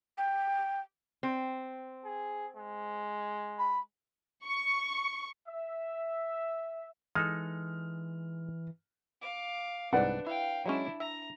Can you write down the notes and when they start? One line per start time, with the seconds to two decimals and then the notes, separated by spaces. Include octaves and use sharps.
0.18 G5
1.23 C4
2.05 G#4
2.56 G#3
3.58 B5
4.44 C#6
5.48 E5
7.15 E3 G#3 D#4 A4 F6
9.21 F5 D6
9.93 C2 G#2 D4 B4 D5 F#5
10.27 E4 F5 G5
10.66 F#3 G#3 C#4 D4 E4
11.00 E5 A#5